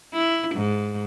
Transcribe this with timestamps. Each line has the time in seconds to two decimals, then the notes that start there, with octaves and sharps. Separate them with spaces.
0.14 E4
0.55 G#2